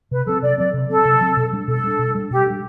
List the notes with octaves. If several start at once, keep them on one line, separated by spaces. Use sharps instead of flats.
C3 B4
F#3 C4 A4
C3 D5
F#3 C4 D5
C3
F#3 C4 A4
C3
F#3 C4
B2
G3 D4
B2 A4
G3 D4
B2
G3 D4
B2 G4
G3 D4